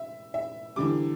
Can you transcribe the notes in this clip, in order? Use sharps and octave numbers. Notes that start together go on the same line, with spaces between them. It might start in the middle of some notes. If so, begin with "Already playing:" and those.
Already playing: E5
E5
E2 D3 G3 D6